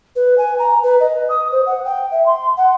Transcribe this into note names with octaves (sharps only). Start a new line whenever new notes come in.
B4
G#5
A#5
B4
D#5
D#6
C5
F#5
G5
E5
C6
F#5